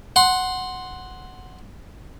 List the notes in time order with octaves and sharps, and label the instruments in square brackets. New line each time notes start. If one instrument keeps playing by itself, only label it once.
[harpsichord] F#5 C6